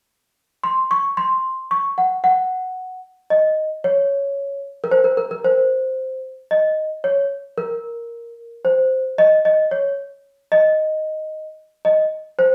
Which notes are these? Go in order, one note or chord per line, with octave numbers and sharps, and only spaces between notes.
C6
C#6
C6
C#6
F#5
F#5
D#5
C#5
A#4
C5
A#4
A#4
A#4
C5
D#5
C#5
A#4
C5
D#5
D#5
C#5
D#5
D#5
C5